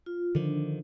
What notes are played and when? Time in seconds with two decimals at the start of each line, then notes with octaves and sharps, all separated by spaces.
0.06 F4
0.35 D3 D#3 F3 D4